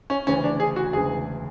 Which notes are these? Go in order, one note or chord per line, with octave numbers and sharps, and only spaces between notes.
C#4
D2 C#3 E3 C#4
D4
G#4
F#4
E1 D2 C#3 E3 G#4